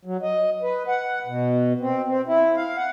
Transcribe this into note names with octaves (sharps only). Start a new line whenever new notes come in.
F#3
D#5
B4
F#5
B2
C4
C4
E4
F5
F#5